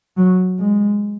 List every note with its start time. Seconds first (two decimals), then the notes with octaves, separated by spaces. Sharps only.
0.17 F#3
0.59 G#3